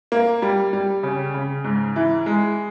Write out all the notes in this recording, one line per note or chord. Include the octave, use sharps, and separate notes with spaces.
A#3
G3
G3
C#3
C#3
G#2
E3
G#3